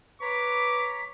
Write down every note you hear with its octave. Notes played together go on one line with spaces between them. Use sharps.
B4 C#5 A#5 D6 B6